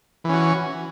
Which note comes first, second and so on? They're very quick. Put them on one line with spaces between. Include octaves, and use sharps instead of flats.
E3 C#4 F#4